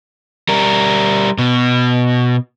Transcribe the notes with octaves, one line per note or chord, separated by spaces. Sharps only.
G3 A#4
B2